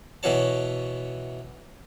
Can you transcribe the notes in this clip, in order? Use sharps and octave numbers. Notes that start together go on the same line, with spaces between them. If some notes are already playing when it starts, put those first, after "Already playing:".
B2 E3 F#4 C#5 A5